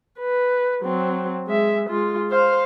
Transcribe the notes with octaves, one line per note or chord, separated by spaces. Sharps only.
B4
F#3 C4
G#3 E5
G#3 F4
C5 F5